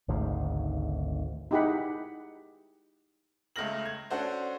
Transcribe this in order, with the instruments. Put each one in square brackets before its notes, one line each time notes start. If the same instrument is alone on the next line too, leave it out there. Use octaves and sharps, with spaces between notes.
[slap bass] G#1 D2 G#2 C#3
[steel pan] D#4 E4 G4 G#4 F#5 B5
[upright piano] C#2 C#3 A3 F6 A#6 F#7
G#6
C#4 D4 F#4 A4 C5